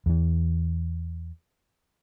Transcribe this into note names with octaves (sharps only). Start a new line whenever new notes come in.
E2 E3